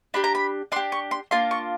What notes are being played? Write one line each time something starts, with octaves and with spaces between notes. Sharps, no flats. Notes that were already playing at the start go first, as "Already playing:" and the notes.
D4 G4 B5
A#5
B5
D4 G4 C6
C#6
C6
A#3 D4 F4 C6
C#6